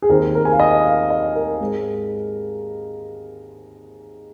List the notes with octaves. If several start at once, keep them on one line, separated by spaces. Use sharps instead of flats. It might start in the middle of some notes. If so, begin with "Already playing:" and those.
G#4
D#2 D#3 C4 A#4
A#4
G#5
F5
D#5
F5
D#5
A#4
G#2 G#3 C4